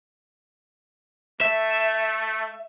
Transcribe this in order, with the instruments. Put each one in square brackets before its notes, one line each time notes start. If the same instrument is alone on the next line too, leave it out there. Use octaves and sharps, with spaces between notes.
[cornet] A3 [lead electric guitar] E5